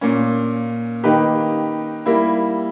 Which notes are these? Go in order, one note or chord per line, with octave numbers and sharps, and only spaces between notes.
A#2 A#3 C#4
D#3 A#3 D#4 G4 B4
G3 A#3 E4